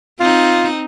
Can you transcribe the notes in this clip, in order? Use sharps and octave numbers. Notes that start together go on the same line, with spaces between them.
C4 D#4 F4